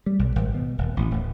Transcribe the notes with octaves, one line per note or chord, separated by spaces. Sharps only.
G3
B1
G#1
B2
D#1
A1
D1